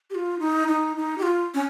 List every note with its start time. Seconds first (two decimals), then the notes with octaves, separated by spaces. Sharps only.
0.10 G4
0.15 F4
0.39 D#4
0.68 D#4
0.97 D#4
1.18 G4
1.23 F4
1.54 C#4